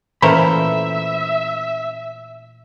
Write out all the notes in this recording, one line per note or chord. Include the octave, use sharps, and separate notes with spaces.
A#2 E3 A3 C#4 C5 E5 A#5 B5